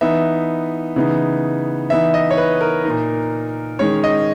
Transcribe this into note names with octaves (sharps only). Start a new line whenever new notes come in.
E3 B3 D#4 E5
C#3 E3 B3 D#4
E3 B3 D#4 E5
D#5
C#5
B4
A#4
A#2 A#3 D#4
D#3 G#3 C#4 C#5
D#5